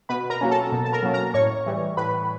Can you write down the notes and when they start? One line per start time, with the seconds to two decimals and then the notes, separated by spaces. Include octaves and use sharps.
0.09 B2 B4 B5
0.30 A#4 A#5
0.41 F#3 A#3 C#4
0.51 A4 A5
0.72 B2
0.85 A5
0.93 A#4 A#5
1.03 F#3 A#3 C#4
1.14 A#4 A#5
1.34 A2 C#5 C#6
1.66 E3 G3
1.97 A2 B4 B5